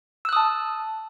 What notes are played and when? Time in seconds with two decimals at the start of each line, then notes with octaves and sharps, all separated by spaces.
0.25 E6
0.29 F#6
0.33 D#6
0.36 A5